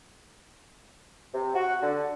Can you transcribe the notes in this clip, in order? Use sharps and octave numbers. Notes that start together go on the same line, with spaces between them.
C3
F#4
D3